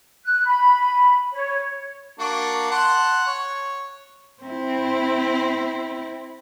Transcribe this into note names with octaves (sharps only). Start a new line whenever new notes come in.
F#6
B5
C#5
A#3 D4 F#4
F#5 A5 C6
C#5
C4 E4